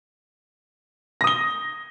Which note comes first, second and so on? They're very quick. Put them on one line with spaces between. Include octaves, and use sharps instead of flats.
A#6 D#6 G7